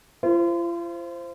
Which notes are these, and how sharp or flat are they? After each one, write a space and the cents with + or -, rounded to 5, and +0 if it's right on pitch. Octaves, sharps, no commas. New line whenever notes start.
F4 -40 C5 +0